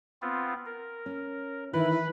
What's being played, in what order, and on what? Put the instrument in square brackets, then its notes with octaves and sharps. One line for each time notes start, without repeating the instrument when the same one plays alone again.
[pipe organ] B3 C4 F4
A#4
[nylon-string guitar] C#4
[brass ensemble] D#3 E4 [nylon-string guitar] E3 [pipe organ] B4 B5